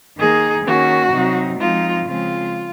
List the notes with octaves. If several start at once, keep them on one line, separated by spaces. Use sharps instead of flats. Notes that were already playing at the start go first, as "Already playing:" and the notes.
D#3 A#3 D#4 G#4
D#3 A#3 C#4 F#4
C3 F#3 C4 D#4
F3 G#3 C4 D#4 F4
C#3 F3 G#3 C4 F4